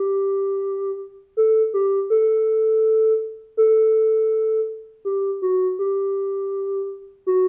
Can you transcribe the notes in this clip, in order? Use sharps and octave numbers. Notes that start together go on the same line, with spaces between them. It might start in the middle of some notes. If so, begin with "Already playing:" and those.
Already playing: G4
A4
G4
A4
A4
G4
F#4
G4
F#4